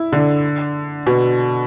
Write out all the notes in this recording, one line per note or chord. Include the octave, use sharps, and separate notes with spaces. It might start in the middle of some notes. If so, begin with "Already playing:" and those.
Already playing: E4
D3
B2